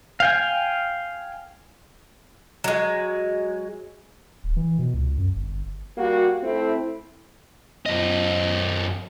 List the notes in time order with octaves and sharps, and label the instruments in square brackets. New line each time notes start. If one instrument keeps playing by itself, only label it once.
[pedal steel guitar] F5 G5 G#5
[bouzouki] F#3 G#3
[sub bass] D1
E3
B2
C#2
F#2
G1
[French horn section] G3 A#3 F#4
A3 C4 E4
[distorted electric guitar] F#2 D#5